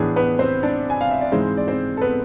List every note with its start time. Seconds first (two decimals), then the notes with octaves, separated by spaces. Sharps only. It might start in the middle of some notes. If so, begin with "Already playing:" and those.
Already playing: A2 E3 B3 D4 G#4
0.16 B3 B4
0.39 C4 C5
0.63 D4 D5
0.90 G#5
1.01 F5
1.11 E5
1.21 D5
1.32 G#2 E3 G#3 C4 C5
1.57 D5
1.68 C4 C5
1.97 A4
2.01 B3 B4